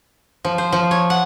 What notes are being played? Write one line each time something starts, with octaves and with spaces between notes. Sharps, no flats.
F3
C5
F3
C#5
F#5